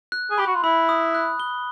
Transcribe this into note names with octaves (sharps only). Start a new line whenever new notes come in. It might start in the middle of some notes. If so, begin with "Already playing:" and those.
F#6
G#4
G4 B5
F#4
F4
E4 B5
D#6
F#6
G7